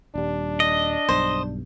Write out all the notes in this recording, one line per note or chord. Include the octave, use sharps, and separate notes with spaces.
D#1 G3 D4
D#5
B1 G2 C5